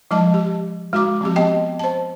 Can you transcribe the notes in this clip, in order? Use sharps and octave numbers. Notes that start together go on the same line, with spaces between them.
F3 G#3 D#5 A5
G4
G#3 F#4 A#5 D6
F3 C4 G4
B3 D#5 G5
C5 A5